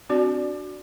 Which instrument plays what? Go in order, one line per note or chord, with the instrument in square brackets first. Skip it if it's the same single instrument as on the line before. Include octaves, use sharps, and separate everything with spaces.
[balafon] C4 D4 F#4 D5